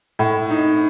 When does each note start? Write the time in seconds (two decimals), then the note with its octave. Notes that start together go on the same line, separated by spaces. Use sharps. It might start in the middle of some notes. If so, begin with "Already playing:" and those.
0.19 A2
0.50 D#4